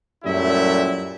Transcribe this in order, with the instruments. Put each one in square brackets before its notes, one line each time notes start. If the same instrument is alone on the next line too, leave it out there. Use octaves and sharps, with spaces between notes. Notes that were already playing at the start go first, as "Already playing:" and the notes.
[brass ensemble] F#2 A#2 G3 A3 E4 E5